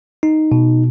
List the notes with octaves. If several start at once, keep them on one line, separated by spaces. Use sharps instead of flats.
D#4
B2